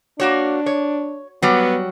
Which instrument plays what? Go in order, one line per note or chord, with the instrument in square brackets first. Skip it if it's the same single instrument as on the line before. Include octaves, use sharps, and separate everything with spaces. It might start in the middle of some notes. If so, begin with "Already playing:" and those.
[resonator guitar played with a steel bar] A#3 F#4 C#5 [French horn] D4
[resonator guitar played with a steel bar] C#5
[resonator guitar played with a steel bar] F#3 G3 [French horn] B3